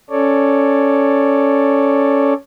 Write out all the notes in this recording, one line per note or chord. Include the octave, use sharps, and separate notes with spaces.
C#4 A4 C#5 D5